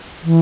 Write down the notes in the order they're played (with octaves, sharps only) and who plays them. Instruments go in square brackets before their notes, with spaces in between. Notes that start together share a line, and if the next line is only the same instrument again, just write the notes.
[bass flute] E3